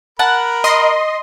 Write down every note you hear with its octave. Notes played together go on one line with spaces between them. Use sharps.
A#4 F#5 A5 B5
D#5 C6